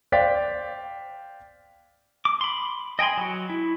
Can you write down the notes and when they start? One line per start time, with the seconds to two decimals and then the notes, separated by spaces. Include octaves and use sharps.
0.12 C5 D5 F5 G5 A6 B6
2.25 D6
2.41 B5 C6
2.99 D#5 G5 G#5 B5 C6
3.17 F#3 F#4
3.50 E4